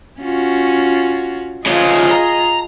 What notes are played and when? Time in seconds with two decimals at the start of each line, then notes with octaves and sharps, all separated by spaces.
0.21 C#4 F4 F#4
1.66 C#3 F3 F4 G#4 D#5
2.11 A#5